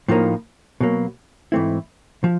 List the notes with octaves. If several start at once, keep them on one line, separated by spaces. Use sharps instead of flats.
A2 F3 A#3 D#4
B2 F#3 A#3
G#2 E3 A3 C4 E4
F3